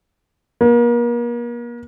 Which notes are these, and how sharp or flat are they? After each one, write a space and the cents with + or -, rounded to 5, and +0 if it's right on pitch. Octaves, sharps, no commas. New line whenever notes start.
A#3 +40